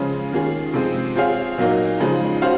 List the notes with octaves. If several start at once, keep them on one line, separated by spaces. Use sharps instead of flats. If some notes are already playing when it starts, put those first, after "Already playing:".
Already playing: C#3 F3 G#3 C#4 F4
D#3 A#3 C#4 F4 G#4
C3 F3 G#3 C4
C4 F4 G#4 C#5 F5
A#2 F#3 A#3 D#4
C#3 F3 G#3 D#4
C#4 F#4 C5 F5